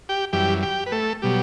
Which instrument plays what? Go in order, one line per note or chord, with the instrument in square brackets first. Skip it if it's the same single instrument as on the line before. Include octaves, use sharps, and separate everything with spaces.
[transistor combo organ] G4 G5
F#2 E3 G3 G4 G5
G4 G5
B4
A3 A4
B2 F#3 G3 G4